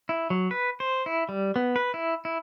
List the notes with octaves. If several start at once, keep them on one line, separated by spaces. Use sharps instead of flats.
E4
F#3
B4
C5
E4
G3
B3
B4
E4
E4